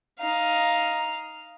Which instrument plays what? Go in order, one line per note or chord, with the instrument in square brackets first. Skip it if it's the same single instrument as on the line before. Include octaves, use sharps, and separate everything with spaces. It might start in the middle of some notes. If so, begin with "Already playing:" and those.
[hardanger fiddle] D#4 F5